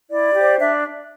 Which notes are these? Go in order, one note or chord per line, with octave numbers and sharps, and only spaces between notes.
E4 D5
G4 C5
D4 E5